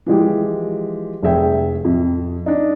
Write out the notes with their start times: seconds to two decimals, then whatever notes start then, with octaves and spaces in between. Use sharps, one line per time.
0.06 E3 F3 G#3 G4
1.22 F1 G#4 E5 G5
1.85 F2
2.46 D4 D#4